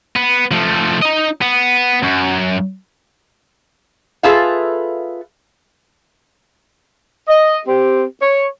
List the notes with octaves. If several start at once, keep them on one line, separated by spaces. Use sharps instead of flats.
B3
F3 A3
D#4 D#5
B3
F#2
F4 G#4 A4 B4 E5 F5
D#5
C4 G4
C#5